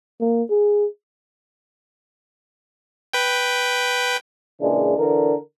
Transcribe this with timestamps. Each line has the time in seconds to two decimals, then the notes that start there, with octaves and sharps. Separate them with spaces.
0.20 A#3
0.50 G#4
3.13 B4 G5
4.61 A#2 C#3 E3 G#3 D4
4.97 D3 E3 D4 A#4